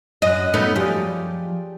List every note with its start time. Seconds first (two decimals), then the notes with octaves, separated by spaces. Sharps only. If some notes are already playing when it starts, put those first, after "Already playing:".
0.22 F#2 D#5 F#6
0.54 A3 B3 D#4
0.76 F3 G4 G#4 D5